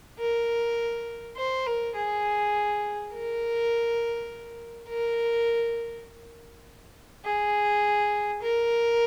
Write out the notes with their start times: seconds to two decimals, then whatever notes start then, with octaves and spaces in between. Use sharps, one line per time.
0.18 A#4
1.36 C5
1.66 A#4
1.95 G#4
3.13 A#4
4.89 A#4
7.24 G#4
8.42 A#4